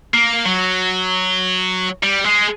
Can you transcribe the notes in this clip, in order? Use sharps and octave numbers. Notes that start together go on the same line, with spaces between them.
A#3
F#3
G3
G#3